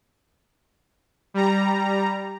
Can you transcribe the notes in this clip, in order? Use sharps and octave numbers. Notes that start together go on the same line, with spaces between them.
G3 A#5